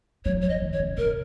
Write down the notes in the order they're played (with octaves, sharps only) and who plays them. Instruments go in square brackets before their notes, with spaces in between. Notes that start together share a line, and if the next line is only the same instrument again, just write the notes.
[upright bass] F#3 [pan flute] C#5
[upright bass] F3 [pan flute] C#5
[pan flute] D#5
[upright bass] D#3
[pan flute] C#5
[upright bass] C#3
[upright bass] C3 [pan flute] A#4